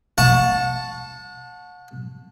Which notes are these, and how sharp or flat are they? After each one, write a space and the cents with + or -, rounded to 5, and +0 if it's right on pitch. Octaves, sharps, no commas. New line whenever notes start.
F#5 -40 A5 +0 C#6 +0